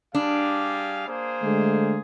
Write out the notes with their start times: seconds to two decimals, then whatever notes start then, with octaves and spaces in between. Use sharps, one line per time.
0.15 G3 D4 G#4 F5
1.08 A#3 G#4 C5
1.42 D3 G#3 A3